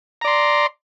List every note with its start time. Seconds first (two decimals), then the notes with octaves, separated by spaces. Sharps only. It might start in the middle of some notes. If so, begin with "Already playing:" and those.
0.21 A#5
0.24 D5
0.27 C6